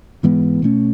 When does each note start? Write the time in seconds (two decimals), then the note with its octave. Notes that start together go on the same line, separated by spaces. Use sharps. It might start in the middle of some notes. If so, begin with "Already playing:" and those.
0.23 G#2 E3 G#3 B3
0.63 B2 A3 C#4